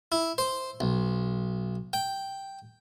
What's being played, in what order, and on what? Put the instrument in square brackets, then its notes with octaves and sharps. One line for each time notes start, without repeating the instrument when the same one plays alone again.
[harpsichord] E4
C5
B1
G5